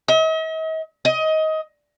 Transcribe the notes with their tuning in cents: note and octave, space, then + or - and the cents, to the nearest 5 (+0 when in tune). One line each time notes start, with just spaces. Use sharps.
D#5 +45
D#5 +20